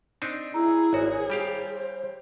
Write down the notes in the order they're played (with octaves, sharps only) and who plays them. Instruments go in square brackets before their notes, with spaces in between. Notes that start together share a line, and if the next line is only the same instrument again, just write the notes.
[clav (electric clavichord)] C4 D4 D#4
[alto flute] E4 [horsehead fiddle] G#4 [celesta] A#5 E6
[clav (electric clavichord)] G#1 F#4 [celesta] C#5
[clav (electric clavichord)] G3 G4 F5 [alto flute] C5